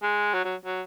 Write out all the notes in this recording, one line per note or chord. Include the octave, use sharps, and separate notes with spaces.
G#3
F#3
F#3
F#3